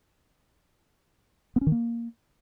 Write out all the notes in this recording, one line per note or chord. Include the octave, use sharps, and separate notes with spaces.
B3
C#4
D#3
A#3